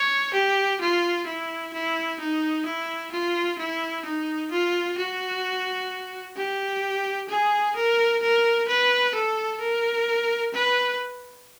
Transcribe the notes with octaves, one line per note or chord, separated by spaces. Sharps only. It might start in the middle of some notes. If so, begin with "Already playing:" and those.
Already playing: C#5
G4
F4
E4
E4
D#4
E4
F4
E4
D#4
F4
F#4
G4
G#4
A#4
A#4
B4
A4
A#4
B4